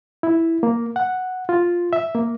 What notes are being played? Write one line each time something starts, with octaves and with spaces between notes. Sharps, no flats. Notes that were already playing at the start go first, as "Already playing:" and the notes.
E4
A#3
F#5
F4
E5
A#3